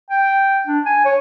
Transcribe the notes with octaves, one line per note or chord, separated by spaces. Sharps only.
G5
D4
G#5
C#5